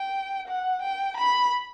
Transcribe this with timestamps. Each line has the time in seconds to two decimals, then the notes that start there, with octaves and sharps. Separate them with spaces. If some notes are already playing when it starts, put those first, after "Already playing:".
Already playing: G5
0.48 F#5
0.82 G5
1.17 B5